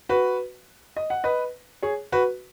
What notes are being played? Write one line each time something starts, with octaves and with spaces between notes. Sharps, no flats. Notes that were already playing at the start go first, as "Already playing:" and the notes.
F#4 B4
D#5
F#5
B4 D#5
G#4 C#5
F#4 B4